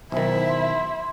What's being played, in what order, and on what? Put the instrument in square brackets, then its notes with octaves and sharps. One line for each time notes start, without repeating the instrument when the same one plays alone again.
[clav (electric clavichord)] B1 D#3 [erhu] E4 [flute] C5 [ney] E5
[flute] C6